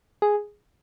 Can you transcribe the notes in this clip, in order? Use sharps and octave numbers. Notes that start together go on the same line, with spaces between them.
G#4